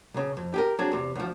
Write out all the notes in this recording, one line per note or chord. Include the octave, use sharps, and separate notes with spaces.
B1 C#3
F2
G4 G#4 A#4
F#3 C4 D4 G#4 D5
E2 C3
D2 F3